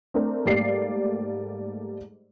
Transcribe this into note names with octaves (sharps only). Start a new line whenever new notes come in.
A3 C4 D4 A#4
G#2 G3 A3 A#3 D5 C7